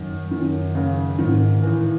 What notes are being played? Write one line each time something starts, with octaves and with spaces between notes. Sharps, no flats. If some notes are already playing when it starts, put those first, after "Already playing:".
Already playing: F#2 D#3
F#2 D#3
C#3
G#2 D#3
A2 E3